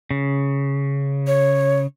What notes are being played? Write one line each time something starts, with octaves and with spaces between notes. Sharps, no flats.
C#3
C#5